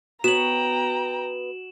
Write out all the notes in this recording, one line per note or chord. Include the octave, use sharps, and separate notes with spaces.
B3 F#4 C#5 G5 A#5 E7 F#7